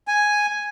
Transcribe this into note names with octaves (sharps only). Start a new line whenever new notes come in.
G#5